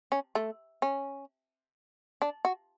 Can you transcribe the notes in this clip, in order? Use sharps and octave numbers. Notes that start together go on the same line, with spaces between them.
C#4
A3
C#4
D4
F#4